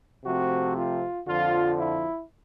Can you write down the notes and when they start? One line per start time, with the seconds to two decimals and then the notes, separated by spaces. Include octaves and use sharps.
0.25 C3 F3 A3 C4 F#4
0.76 F4
1.27 F2 D3 F3 F4
1.77 E4